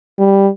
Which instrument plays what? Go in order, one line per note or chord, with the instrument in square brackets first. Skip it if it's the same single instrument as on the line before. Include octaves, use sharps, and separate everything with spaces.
[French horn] G3